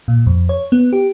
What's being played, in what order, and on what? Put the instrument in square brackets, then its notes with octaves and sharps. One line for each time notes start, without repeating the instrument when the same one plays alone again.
[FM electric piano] A#2
F2
C#5
B3
G4